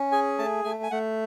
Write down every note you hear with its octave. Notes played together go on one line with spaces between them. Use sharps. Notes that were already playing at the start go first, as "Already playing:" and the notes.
Already playing: C#4
G#4 G#5
A3 A5
A3 G#5
G#5
A3 F#5